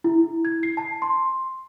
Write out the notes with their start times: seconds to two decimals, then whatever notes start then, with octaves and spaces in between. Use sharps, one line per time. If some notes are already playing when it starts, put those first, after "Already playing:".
0.04 E4
0.45 G#6
0.63 C7
0.77 A5
1.02 C6